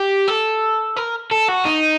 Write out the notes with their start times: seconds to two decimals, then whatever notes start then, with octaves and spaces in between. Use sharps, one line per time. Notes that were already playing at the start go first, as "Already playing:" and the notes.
Already playing: G4
0.28 A4
0.97 A#4
1.31 A4
1.48 F#4
1.65 D#4